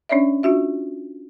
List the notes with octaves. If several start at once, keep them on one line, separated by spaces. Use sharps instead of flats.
C#4 D4 C#5 D5 E5
D4 F4 F#4 E5